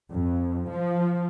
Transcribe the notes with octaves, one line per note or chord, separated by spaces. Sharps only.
F2
F3